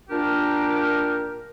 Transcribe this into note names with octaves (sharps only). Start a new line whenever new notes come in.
A#2 D4 F4 G4 A#4